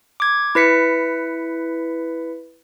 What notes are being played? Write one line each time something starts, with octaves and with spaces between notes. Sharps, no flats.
D6 G#6
E4 B4 B6 C#7